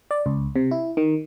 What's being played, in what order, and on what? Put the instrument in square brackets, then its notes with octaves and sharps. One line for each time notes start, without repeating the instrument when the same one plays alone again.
[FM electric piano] D5
C#2
C3
E4
D#3